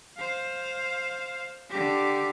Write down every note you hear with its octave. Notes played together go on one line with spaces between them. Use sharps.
C5 F5
D3 G4